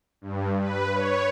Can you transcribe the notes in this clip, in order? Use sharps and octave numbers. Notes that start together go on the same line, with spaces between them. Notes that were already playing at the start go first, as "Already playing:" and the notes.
G2
B4
C#5